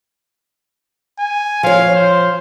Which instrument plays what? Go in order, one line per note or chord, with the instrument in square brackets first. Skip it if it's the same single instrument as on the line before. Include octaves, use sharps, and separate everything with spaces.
[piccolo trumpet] G#5
[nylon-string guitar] F3 C#5 [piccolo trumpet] F5
[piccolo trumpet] C5